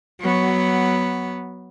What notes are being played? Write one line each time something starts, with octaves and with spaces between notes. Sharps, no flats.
F#3 B3